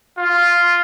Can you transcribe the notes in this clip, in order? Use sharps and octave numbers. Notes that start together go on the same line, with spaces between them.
F4